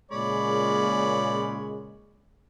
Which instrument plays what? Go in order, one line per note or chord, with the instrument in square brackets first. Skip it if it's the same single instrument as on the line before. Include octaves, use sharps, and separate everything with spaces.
[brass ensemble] A#2 C#3 G#3 [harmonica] C#5 D5 B5